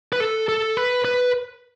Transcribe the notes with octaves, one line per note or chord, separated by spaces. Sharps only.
B4
A4
A4
B4
B4